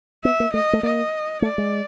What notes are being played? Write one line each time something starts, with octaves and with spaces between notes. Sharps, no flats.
B3 E5
A#3
A3 D#5
A3
A#3 D#5
A3 D5
G#3